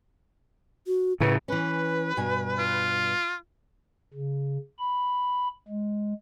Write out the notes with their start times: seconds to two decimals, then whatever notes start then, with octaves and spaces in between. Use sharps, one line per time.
0.87 F#4
1.20 A2 C#3 B4
1.48 E3 C#4 B4
2.17 G2 B2 G#5
2.59 F4
4.14 C#3
4.79 B5
5.68 G#3